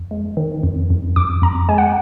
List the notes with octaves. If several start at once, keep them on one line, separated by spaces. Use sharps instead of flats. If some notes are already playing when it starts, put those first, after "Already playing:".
Already playing: F2
G#3
D#3
F2
F2
F2 D6
F2 A#5
G#3 G#5
F#5